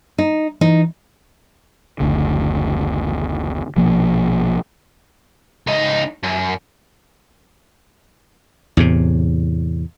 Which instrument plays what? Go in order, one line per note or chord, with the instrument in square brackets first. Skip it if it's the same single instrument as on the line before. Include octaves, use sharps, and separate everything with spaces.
[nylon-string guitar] D#4
[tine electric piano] E3 [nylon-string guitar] D#4
[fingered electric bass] F#1 D2 D3
A#1 B2 F3 A#3
[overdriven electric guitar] C#2 D#4
F#2
[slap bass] E2 A2 C3